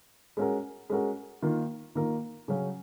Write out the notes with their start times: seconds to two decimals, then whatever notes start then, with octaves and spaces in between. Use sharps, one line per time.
0.37 G#3 C#4 F#4 A#4
0.90 G#3 C#4 F#4 A#4
1.43 D#3 A#3 F4 A#4
1.95 D#3 A#3 F4 A#4
2.48 C#3 F#3 C#4